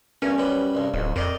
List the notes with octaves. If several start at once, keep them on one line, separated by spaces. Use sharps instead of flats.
E2 G2 C#4 A#4
F#2 G3 B4
C2 G2
D1 F2
F2 A#4 D5 D#5